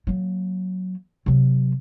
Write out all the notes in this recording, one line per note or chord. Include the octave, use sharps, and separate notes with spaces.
F#3 A#3
C3 F#3